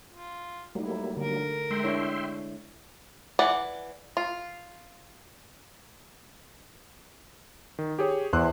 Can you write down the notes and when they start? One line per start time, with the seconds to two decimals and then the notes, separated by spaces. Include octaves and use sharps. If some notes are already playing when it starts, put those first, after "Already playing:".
0.10 F4
0.75 F#3 G3 A3 A#3 D#4 E4
1.17 D3 A#4
1.71 G#3 E5 G5 C6
1.84 D4 E4 C#5
3.39 E3 D5 F#5
4.17 F4
7.79 D#3
7.99 G4 G#4 C#5
8.33 E2 C5 C6 F#6